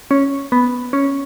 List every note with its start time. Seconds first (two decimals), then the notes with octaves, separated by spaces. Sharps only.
0.11 C#4
0.52 B3
0.93 C#4